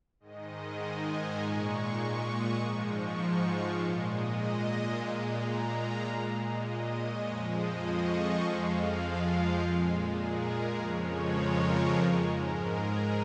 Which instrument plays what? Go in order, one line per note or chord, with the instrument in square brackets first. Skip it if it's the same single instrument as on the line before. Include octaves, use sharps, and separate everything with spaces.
[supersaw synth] G#2 D#3 G#3 D#5
G#5
A#5
A#2 G#3 C#6
C#6
D#6
G#2 F3 G#3 C#6
C#6
F5
A#2 G#3 C#5
D#5
D#5
A#2 G#3 F5
A#5
A#5
F5
A#2 G#3
D#5
C#5
F2 F3 G#3
D#5
C#6
F2 F3 G#3 F5
F4
A#2 G#3
G#4
A#4
F2 C#3 F3 G#3 C#5
A#4
G#4
G#2 G#3
A#4
G#4